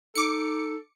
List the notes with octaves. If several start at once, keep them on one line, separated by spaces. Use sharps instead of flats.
D#4 A4 D6 C#7